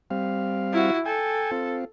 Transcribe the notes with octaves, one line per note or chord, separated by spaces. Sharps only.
G3 C4 F5
E4 F#4
A4 G5 G#5
C4 F4